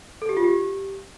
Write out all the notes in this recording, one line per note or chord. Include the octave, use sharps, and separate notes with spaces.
A4
G4
F4
G4